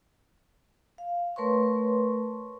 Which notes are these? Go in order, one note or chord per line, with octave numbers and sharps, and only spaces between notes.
F5
A3 A#4 B4 C#5 C6 C#6